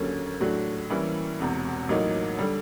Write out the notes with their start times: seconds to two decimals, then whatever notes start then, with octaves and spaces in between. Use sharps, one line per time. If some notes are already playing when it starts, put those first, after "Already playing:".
Already playing: D#2 D3 F#3 A#3 C#4
0.40 A2 F#3 A3 D4 F#4
0.90 E3 G3 A#3 C#4 E4
1.40 E1 E2 C3
1.89 A1 A2 F#3 A#3 D#4
2.38 D3 G3